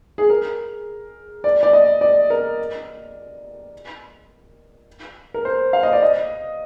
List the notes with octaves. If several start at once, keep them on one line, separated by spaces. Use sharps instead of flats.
G#4
A#4
D5
D5
D#5
D5
A#4
A#4
C5
F5
D#5
D5
D#5